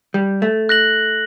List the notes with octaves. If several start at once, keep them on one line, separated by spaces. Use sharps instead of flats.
G3
A3
F#6 A#6 F#7